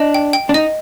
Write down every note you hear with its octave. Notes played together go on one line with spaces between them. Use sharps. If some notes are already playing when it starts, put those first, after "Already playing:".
Already playing: D4 D#5
G5
G5
D4
D#4 D#5